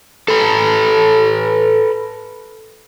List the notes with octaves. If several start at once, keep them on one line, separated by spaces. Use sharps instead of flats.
A4 B4